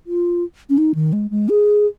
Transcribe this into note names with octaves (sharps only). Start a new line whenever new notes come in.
F4
C#4
D#4
D#3
G#3
G#3
G#4